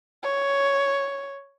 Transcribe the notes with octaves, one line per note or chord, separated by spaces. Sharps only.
C#5